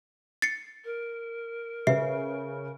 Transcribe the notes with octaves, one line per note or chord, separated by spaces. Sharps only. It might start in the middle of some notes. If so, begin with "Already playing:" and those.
A6 C7 C#7
A#4
C#3 B4 E5 C7